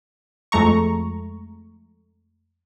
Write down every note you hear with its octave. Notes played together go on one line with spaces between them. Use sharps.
F2 G#3 A3 A#5 C#6